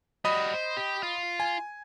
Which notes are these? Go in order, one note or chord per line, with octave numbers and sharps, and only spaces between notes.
G3 F#4 D#5 B5 D#6
C5
G4
F4
G#5